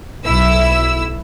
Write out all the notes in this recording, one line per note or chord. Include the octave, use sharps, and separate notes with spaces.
B1 E4 E6